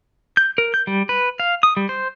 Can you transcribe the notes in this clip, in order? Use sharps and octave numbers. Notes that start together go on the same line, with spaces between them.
G6
A#4
G6
G3
B4
F5
D#6
G3
C5